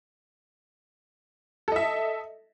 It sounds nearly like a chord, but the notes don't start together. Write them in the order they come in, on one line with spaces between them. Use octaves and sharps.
A4 D#5 E5